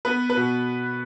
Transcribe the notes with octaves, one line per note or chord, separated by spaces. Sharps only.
B3 B4
B4
B2